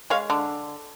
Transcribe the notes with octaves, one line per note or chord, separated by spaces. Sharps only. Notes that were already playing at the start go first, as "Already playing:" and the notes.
G#3 C#5 F5
D3